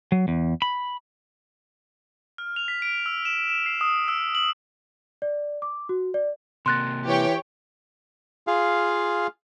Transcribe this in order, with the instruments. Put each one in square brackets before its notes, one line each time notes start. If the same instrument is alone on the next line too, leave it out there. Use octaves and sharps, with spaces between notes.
[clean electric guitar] F#3
E2
B5
[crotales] F6
F7
B6
D7
E6
E7
E7
C7
D#6
E6
F#7
[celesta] D5
D6
F#4
D5
[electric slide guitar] C3 A#3 [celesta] C6 F#6 A6
[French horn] E3 [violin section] G4 C#5 G5
[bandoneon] F4 G#4 F5